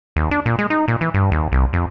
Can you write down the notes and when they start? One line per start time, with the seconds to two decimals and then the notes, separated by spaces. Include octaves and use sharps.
0.16 D#2
0.31 D4
0.46 A#2
0.59 G#3
0.70 D#4
0.88 A#2
1.01 E3
1.14 G2
1.32 D#2
1.52 C2
1.73 F2